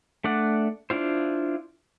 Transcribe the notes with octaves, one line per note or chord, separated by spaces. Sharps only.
A3 D4 D5 F#5
D4 E4 F4 C5